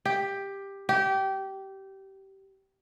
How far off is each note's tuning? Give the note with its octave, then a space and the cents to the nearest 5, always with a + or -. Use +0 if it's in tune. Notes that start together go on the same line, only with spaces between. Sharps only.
G4 +10
G4 -20